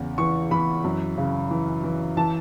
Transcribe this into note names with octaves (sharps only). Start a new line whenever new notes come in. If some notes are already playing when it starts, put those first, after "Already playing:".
Already playing: E2 C#3
E3 C#6
E3 B5
F#2
C#3
E3
E3
E3 A5